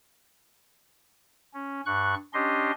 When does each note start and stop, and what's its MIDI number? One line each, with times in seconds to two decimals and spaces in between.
1.54 1.81 61
1.86 2.14 43
1.86 2.14 85
1.86 2.14 90
2.33 2.71 61
2.33 2.71 62
2.33 2.71 67
2.33 2.71 75
2.33 2.71 84